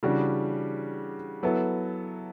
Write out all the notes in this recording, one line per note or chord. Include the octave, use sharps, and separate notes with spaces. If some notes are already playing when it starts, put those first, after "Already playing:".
C#3 E3 G3 D4 F#4
F#3 B3 E4 A4